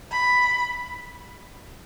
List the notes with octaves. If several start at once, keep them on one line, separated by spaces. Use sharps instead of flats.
B5